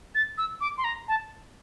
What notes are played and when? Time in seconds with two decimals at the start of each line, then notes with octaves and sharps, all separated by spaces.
0.15 A6
0.38 E6
0.61 D6
0.78 C6
0.84 A#5
1.08 A5